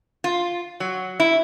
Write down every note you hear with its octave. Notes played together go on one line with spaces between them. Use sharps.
F4
F#3
E4